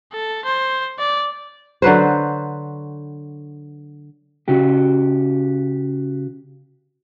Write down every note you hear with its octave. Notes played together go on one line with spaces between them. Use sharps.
A4
C5
D5
D3 F#3 B4 C5
C#3 F#4 G4